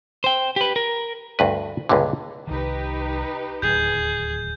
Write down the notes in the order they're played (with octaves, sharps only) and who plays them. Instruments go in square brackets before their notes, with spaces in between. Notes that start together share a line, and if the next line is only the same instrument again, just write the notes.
[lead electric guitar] C5 G5
G4 B4
A#4
[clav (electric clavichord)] D2 G2 B4
C#2 G2 A#2 D3
[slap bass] C2 D#3 [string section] D#4 G4 B4
[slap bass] D1 D#2 F#3 [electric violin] G#4 [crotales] G6